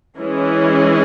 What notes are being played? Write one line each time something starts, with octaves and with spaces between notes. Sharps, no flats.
E3 G#3 C#4 E4 G#4